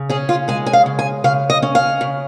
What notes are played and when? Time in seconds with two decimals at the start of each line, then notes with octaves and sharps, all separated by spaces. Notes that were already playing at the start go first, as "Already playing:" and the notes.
Already playing: C#3
0.09 C#4 G#4
0.29 F4
0.48 G#3 G#5
0.66 G#5
0.73 F5
0.86 C#3
0.99 G#5
1.24 C#3 F5
1.50 D#5
1.62 C#4
1.75 F5
2.01 C#3